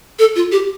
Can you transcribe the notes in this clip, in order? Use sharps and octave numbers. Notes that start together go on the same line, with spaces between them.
A4
F4
G4